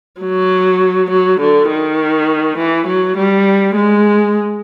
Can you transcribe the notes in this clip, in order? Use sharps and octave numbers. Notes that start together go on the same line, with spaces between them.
F#3
F#3
D3
D#3
E3
F#3
G3
G#3